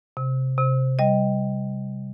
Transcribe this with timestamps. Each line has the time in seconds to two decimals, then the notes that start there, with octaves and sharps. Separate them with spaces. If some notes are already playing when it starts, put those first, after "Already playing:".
0.17 C3
0.58 C3
0.99 G3 D#5